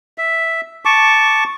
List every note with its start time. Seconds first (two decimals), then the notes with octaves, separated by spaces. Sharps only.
0.18 E5
0.85 A5 C#6 D6